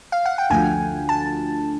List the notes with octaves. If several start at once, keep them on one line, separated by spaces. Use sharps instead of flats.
F5
F#5
G5
D2 D3 F3 G#5
A5